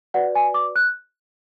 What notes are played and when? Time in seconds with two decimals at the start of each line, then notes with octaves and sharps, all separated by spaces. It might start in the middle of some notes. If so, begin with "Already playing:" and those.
0.14 F#4 B4 D5 F#5
0.35 G#5
0.54 D6
0.76 F#6